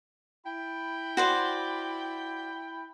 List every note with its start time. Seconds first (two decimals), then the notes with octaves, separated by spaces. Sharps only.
0.46 E4 G5 B5
1.17 F#4 C5 D5